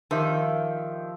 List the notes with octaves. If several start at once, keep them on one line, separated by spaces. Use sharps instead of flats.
D#3 F3 G4 E5